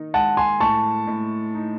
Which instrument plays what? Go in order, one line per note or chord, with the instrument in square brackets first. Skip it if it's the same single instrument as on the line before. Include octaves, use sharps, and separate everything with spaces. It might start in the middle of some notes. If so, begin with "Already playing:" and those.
Already playing: [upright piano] D#3 D#4
[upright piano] G#3 [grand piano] F#5 A5
[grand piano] G#5 C6
[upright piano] A2 [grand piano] A5 C#6
[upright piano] A2
D#4